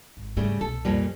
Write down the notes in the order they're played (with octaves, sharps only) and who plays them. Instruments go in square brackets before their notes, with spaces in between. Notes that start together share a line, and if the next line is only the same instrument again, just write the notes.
[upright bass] G#1
[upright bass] G#2 [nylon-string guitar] C#3 G3 A3
[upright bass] C2 B2 [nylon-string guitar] A4
[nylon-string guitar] F2 A#2 G3